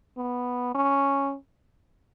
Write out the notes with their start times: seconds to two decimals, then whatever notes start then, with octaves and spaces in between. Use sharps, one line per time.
0.17 B3
0.75 C#4